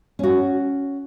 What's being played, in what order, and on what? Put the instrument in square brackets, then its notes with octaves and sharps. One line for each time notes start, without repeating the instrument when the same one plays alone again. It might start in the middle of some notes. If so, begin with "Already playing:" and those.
[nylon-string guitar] C#4 F#4